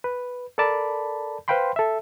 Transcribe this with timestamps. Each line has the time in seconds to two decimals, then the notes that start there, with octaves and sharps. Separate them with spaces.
0.04 B4
0.58 A4 A#4 D5 A5 B5
1.48 B4 C5 F5 G5 B5 C6
1.76 A4 E5